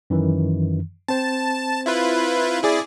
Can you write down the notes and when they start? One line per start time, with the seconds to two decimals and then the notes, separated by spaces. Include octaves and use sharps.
0.10 F#2 D#3 E3
1.08 C4 C5 A5
1.86 E4 F4 B4
2.63 E4 G#4 D5